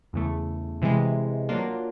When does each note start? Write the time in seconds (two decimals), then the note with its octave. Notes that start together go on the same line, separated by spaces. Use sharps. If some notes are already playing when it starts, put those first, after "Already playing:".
0.13 E2 C#3 E3 A3
0.82 C3 E3 G#3
1.49 F#3 A#3 D4 F4